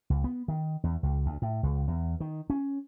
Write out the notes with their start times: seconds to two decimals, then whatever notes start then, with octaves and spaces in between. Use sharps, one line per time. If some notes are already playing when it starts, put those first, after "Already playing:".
0.10 C#2
0.24 B3
0.48 D#3
0.84 E2
1.03 C#2
1.26 D2
1.42 A2
1.63 C#2
1.88 E2
2.20 D#3
2.50 C#4